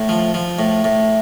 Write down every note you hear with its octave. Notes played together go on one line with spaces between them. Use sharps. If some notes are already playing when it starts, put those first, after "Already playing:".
Already playing: A2
F3
F3
A2
A2